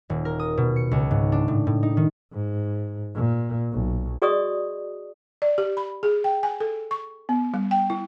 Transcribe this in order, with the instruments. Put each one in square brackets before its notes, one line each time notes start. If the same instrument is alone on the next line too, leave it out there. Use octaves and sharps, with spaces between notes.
[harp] D#1
A#4
D#6
B2
C#7
C#2
G#2
D4
A2
A2
D#4
D#3
[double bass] G#2
A#2
B1
[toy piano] F#4 G#4 D5 D#5 C#6 D#6
[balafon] D5
G4
B5
G#4
G5
G#5
A4
C#6
B3
G3
G5
E4